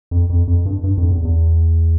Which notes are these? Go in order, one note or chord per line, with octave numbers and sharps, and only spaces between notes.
F2
F2
F2
G2
G2
F2
E2
E2